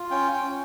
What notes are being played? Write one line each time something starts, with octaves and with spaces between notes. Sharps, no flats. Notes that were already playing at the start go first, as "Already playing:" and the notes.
Already playing: F4
C#4 G5
G5
C#4